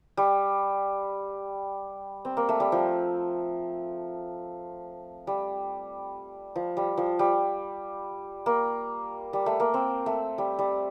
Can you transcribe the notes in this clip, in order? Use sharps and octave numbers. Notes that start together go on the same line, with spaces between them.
G3
C4
A#3
A3
G3
F3
G3
F3
G3
F3
G3
A#3
G3
A3
A#3
C4
A3
G3
G3